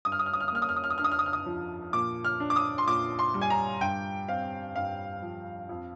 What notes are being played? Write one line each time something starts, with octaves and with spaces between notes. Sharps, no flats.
G2 D#6
F6
D#6
F6
D#6
F6
D#6
A#3 F6
D#6
F6
D#6
F6
D#6
D4 F6
D#6
F6
D#6
F6
D#6
F3
A#2 D6
F6
D4
D6
D#6
C6
A#2 D6
C6
G3
G#5
A#5
G2 G5
C4 F5
G2 F5
F3
F2